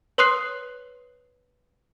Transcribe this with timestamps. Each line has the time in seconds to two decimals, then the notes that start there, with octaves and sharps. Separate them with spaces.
0.18 B4 C#5 C6 D#6 F#6 C7